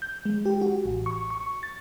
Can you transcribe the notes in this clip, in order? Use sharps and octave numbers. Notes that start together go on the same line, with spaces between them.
G6
G#3
G4
F#4
A1
C#6
C#6
A6